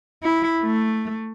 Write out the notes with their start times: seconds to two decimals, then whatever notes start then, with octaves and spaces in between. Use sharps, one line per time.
0.23 E4
0.63 A3